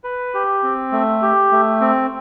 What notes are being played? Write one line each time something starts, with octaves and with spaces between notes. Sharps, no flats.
B4
G4
C4
A3
G4
A3
C4